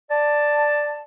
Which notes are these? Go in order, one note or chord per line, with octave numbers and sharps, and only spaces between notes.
D5 A5